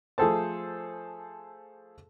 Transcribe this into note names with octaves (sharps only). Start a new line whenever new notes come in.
F3 A3 G#4 A4 C5 A5